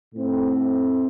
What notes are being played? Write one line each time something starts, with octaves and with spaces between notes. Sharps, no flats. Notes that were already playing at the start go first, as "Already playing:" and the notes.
A2 A3 C4